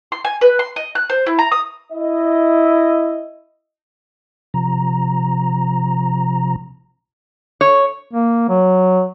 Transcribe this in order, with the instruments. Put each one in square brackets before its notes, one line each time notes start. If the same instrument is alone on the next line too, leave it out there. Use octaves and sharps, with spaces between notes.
[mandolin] C6
G#5
B4
C6
D#5
F#6
C5
E4
A#5
D#6
[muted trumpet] E4 [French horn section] D#5
[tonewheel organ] C3 F3 A#5
[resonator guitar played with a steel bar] C#5
[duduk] A#3
F#3